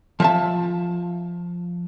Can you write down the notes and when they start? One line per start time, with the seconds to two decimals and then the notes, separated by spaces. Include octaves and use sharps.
0.20 F3 E5 A5